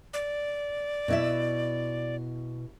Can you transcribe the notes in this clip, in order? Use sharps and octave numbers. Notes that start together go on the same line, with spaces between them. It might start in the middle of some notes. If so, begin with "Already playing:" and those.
D5
B2 E4 E5